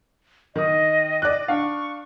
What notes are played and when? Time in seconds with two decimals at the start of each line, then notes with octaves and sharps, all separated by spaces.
0.56 D#3 D#5 D#6
1.22 D5 F#6
1.48 D4 F5 C#6